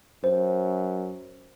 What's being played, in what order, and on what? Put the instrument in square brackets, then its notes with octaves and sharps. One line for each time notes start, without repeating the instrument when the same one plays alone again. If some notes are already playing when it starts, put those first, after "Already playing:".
[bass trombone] F#2 [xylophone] C5